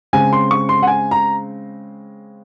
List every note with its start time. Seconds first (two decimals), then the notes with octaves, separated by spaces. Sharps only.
0.13 C#3 G#3 C4 G#5
0.33 C6
0.51 C#6
0.69 C6
0.82 F#5
0.87 G#5
1.11 A#5